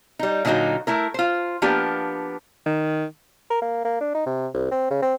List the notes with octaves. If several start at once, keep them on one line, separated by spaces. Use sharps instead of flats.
G3 D#4
A#2 D3 F#3 D#4 F#4 D#5
A3 E4 A#4
F4 C5
F3 A#3 B3 D4 G4
D#3
A#4
A#3
A#3
D4
D#4
C3
C2
C4
C#3
C4